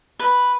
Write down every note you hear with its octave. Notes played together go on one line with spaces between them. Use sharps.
B4